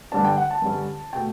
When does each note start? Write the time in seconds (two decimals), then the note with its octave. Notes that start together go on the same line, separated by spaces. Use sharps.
0.12 G2 D3 G3 D4 A5
0.25 G5
0.37 F#5
0.51 A5
0.62 G2 D3 G3 C#4
1.13 B2 A3 G5